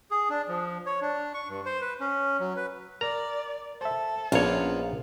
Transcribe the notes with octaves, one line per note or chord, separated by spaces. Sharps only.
G#4
D4
F3
C#5
D4
C#6
G2
C5
B4
C#4
F#3
B4
A#4 D5 A#5
A4 C5 E5
A#1 A#3 B3 C#4 D4 F4 C#5